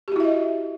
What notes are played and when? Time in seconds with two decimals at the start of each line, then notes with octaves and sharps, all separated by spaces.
0.08 G4
0.12 F#4
0.16 E4
0.20 E5
0.24 D#5